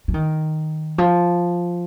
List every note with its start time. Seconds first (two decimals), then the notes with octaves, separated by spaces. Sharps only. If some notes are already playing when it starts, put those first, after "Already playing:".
0.08 F3
0.14 D#3
0.98 F3